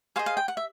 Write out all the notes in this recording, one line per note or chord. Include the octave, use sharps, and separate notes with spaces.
G#4 C5 D#5 F5
F5
G5
F#5
E5